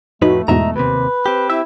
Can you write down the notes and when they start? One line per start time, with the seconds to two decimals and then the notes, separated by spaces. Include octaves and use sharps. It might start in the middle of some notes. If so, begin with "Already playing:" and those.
0.22 F2 A2 A3 D#4 F#4 B4
0.48 E2 G#2 B2 D#5 E5 A#5
0.76 D#2 C3 B4
1.26 C4 G4
1.50 E4 E5